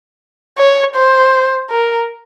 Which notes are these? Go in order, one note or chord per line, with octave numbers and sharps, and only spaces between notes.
C#5
C5
A#4